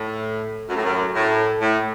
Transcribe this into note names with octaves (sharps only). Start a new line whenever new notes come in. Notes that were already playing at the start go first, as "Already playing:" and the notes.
Already playing: A2
F#2
A2
F#2
A2
A2